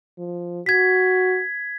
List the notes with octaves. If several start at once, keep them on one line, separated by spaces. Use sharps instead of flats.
F3
F#4 G#6 B6